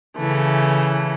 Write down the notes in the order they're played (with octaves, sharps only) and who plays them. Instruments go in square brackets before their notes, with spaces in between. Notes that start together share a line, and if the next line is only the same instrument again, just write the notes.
[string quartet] C#3 E3 A3